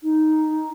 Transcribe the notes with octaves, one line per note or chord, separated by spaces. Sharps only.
D#4